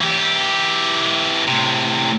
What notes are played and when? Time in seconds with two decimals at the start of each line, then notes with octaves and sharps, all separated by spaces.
0.01 E3 G4
1.47 A2 C3